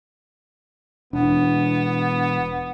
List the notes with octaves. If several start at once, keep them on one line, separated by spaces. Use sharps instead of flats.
E1 B3 D4